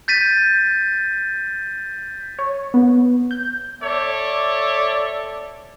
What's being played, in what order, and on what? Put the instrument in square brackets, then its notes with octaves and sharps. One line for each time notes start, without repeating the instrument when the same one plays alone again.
[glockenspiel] G6 A6 B6 D#7
[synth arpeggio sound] C#5
B3
G6
[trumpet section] A4 C#5 D5 E5